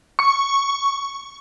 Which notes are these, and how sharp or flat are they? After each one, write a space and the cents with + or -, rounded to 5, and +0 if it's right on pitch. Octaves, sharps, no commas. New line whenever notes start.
C#6 +0